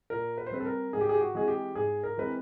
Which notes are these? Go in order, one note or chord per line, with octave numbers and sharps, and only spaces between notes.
A#2 A#4
B4
C5
G3 C4 B4
A4
A#4
G#2 G#4
G4
G#4
G4
F#4
E3 G#3 C4 G#4
G4
G#2 G#4
A#4
E3 G#3 C4 B4